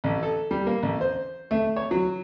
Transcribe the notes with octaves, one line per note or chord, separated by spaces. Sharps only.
A1
A4
G3
A#3
A1
C5
A3
C#5
F#3